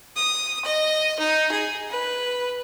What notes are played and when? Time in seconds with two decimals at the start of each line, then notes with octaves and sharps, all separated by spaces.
0.16 D#6
0.65 D#5
1.19 D#4
1.52 G#4
1.91 B4